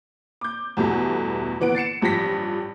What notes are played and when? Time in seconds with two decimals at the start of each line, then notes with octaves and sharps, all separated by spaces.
0.41 D6 G6
0.77 E2 G2 B2 A3
1.60 A#2 E3 B3 F#5 D7
1.75 A6 C7 C#7 E7
2.02 A1 G2 F3 G4 A#6 B6